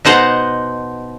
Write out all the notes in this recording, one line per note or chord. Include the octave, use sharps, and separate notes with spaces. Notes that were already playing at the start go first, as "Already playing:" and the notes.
B2 D#4 C5 F#5 A#5